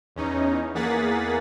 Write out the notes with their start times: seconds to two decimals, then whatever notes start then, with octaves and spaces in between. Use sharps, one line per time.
0.16 E2 C#4 D#4
0.74 E2 A#3 G#4 F#5 A6 B6